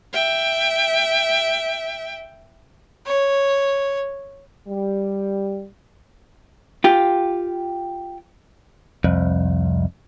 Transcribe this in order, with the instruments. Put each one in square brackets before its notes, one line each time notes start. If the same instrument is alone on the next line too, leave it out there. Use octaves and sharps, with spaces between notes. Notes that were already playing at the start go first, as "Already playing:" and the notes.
[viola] E5 G5
[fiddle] C#5
[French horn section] G3
[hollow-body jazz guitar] F4 G4
[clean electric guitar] C2 F2